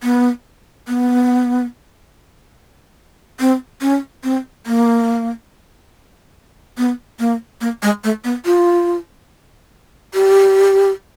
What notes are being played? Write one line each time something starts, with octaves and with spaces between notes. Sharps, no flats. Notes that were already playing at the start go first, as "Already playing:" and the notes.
B3
B3
C4
C#4
C4
A#3
B3
A#3
A#3
G#3
A3
B3
F4
G4